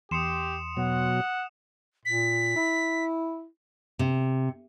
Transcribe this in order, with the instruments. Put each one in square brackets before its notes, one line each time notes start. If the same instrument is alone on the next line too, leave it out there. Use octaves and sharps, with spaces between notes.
[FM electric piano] E2 C6 [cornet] G4 [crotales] D#6 C#7 E7
[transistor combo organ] B2 F#3 [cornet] F#5
[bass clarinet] A#2 [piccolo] B6
[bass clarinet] E4
[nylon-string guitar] C3